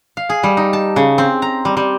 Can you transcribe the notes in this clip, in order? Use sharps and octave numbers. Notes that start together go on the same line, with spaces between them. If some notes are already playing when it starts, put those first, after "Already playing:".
F5
G#4
G3
D#4
A5
C#3
C4
A#5
G3
G3